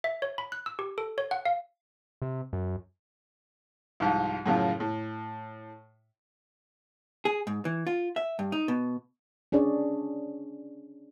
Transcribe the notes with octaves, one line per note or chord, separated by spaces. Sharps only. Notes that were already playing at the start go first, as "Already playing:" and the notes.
E5
C#5
B5
F#6
E6
G4
A4
C#5
F#5
F5
C3
F#2
C2 G#2 F3
F#2 A2 C#3 F3 F4
A2
G#4
G#2
E3
F4
E5
G2
D#4
B2
C#4 D4 G#4 C#5 D5